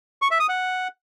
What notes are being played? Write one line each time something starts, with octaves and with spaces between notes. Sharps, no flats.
C#6
E5
D#6
F#5